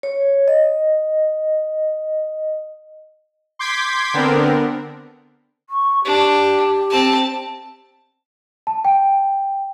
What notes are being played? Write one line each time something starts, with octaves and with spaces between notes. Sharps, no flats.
C#5
D#5
C6 D6 G6 G#6 B6
D3 B3 C4 D4 A#4
C#6
D4 G4
C4 A5
A5
G5